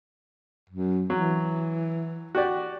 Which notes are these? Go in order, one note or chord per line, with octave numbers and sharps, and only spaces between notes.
F#2
E3 F#3
F#4 G4 D5